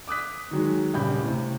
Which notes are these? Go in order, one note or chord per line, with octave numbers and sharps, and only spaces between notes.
D6 D#6 F#6 B6
D#3 F#3 G#3
D#1 G2 C#3 G4 B5 G6
A2 C3